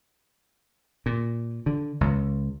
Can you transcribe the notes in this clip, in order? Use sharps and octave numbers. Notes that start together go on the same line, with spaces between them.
A#2
D3
C#2